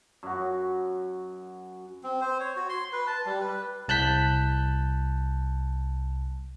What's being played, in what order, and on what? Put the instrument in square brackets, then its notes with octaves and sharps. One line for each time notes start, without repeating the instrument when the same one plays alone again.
[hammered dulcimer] F#2 F#4
[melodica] C4
C5
C#5
F#4
C6
B4
A5
G3
B4
[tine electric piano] C2 A5 F#6 G6 B6